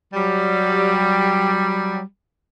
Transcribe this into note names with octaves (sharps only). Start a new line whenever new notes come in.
F#3 G3